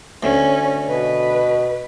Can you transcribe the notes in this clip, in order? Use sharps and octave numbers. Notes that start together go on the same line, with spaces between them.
D2 C#4
B2 B4